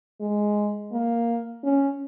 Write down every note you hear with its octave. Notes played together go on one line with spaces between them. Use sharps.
G#3
A#3
C#4